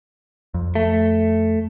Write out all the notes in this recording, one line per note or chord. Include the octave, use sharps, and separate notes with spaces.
F2
A3